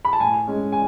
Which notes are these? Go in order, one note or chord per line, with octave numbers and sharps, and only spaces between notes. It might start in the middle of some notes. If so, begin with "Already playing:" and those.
B5
A5
A2 G#5
G#3 C#4
G#5